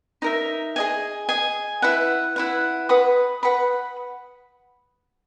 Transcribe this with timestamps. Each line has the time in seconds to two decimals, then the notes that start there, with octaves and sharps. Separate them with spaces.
0.22 D#4 A#4 E5
0.76 G#4 D#5 G#5
1.29 G#4 D#5 G#5
1.82 E4 B4 F#5
2.36 E4 B4 F#5
2.89 B4 F#5 B5 D#6
3.43 B4 F#5 B5 D#6